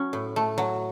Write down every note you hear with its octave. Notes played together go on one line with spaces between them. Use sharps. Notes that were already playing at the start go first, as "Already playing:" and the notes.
Already playing: F#3 C#4
A2
A3
F#3